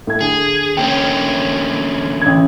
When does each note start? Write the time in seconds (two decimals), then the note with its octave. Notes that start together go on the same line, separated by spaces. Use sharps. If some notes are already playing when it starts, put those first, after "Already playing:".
0.07 A2 G#6
0.21 D3 G#4
0.77 D3 A#3 C#4 G5
2.21 A1 G#6